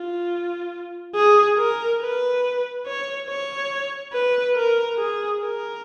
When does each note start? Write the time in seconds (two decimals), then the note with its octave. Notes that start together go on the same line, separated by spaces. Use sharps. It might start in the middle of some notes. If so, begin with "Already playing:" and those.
Already playing: F4
1.16 G#4
1.58 A#4
2.01 B4
2.86 C#5
3.28 C#5
4.13 B4
4.56 A#4
4.98 G#4
5.41 A#4